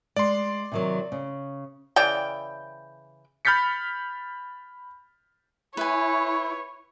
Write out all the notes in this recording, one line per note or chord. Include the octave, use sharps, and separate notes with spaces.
G#3 D5 C6
C3 D#3 F#3
C#3
C#3 E3 D5 G5
B5 F6 G6 A6 B6 C#7
E4 B4 C#5 G#5